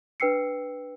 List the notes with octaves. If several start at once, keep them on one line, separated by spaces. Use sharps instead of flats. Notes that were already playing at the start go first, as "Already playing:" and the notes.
D4 B4 G5 E6 C7 C#7